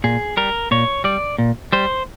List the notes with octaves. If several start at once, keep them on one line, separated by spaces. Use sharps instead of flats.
A#2 G#4
G3 A#4
A#2 C#5
G3 D5
A#2
G3 C5